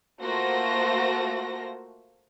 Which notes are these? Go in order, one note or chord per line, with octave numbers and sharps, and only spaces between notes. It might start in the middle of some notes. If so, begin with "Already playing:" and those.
A3 A#3 F4 F#4 C5 A#6